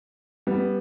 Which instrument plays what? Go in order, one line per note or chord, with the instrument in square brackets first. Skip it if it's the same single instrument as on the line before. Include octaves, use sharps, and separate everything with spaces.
[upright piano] G3 B3